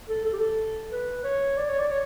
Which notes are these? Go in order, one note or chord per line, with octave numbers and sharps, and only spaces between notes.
A4
A4
G4
A4
B4
C#5
D5
C#5
D5
C#5